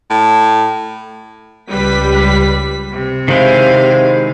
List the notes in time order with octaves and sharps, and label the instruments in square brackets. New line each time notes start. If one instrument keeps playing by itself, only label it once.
[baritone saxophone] A2
[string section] C#2 G3 B6 [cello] B4
[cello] C3
[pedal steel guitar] D#3 G#3 E4 [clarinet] C5 [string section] F5